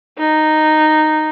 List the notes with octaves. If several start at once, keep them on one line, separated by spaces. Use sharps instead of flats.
D#4